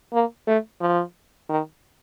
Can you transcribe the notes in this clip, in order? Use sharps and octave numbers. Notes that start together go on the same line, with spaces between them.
A#3
A3
F3
D#3